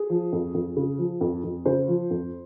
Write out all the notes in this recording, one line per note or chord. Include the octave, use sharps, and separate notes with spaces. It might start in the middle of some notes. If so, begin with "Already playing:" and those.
Already playing: G#4
F3
F2
F2
C#3
F3
F2
F2
C#3 C5
F3
F2